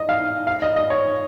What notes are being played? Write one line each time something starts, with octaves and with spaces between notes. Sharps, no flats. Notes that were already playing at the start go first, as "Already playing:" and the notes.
Already playing: D#5
F5
F5
D#5
D#5
C#5